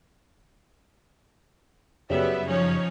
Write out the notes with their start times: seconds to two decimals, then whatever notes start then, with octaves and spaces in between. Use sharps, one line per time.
2.10 F#2 C#3 G3 B3 G4 E5
2.46 F3 C#4 D#4 C#5